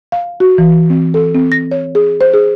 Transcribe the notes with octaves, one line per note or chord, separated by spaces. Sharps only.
F5
F#4
E3
C4
A4
C4
A#6
C#5
G#4
C5
G#4